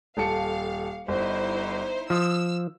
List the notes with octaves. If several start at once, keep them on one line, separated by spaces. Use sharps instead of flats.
D#1 A4 F5 C#7
G1 D#4 E4 C5
F3 D#6 E6